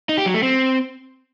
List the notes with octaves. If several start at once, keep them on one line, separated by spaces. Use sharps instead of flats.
D#4
G4
F#3
A3
C4